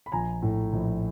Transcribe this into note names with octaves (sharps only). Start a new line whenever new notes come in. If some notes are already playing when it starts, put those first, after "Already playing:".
B5
A#1 G#5 A#5
A2
A#1